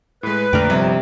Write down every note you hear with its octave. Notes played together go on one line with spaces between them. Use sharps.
A2 G#3 B4
A#1 F2 D3 A3 A#4 D5 G5
G1 C3 F3 G3